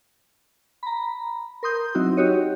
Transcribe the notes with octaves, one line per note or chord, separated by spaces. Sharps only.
A#5 B5
A#4 C6 D#6 G6
F#3 C4 D#4 E4 F#4
D#4 F#4 G4 C#5 D#5